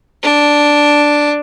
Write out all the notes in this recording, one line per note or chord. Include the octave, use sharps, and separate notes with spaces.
D4